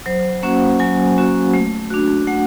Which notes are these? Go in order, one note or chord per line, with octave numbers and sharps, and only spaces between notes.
F#3 C5
A#3 C#4 F#4 F#5
F#3 G#5
A#3 C#4 F#4
A3
D4 F#4
A3 F#5